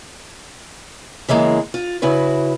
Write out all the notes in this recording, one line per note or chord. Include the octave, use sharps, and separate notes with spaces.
C#3 E3 G#3 A#3
F4
C#3 E4 F#4 B4